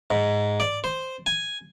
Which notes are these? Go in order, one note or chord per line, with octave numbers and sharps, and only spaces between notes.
G#2
D5
C5
G#5